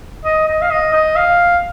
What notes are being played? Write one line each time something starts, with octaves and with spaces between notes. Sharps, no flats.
D#5
D#5
F5
D#5
D#5
F5